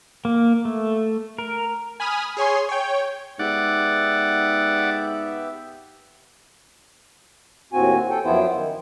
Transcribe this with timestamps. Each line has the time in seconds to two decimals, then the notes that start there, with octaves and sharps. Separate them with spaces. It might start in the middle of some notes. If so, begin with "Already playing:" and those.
0.25 A#3
0.65 A3
1.38 A#4
2.00 G#5 B5 D#6 F6
2.37 G#4 C#5 G#5 C6
2.69 C#5 G5
3.39 G#2 B3 G4 D5 E5 F#5
7.73 D#2 A2 C4 F#4 G#5
8.10 A4 G5
8.24 F#2 F3 B3 E4 C5 G5
8.54 D#3